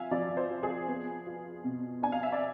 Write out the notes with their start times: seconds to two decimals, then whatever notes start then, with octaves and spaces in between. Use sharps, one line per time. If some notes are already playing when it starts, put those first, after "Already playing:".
Already playing: F3 E5 F5 G#5
0.11 F3 D5
0.37 C5
0.50 F4
0.63 G#4
0.88 B3
1.26 F4
1.64 B2
2.02 D4 G#5
2.12 F5
2.23 E5
2.32 D5